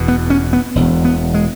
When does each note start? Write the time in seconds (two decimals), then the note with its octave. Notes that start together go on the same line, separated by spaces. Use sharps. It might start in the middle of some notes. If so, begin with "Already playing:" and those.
Already playing: E1 E2 B2
0.08 B3
0.30 C#4
0.53 B3
0.75 E1 E2 B2
1.05 B3
1.34 G#3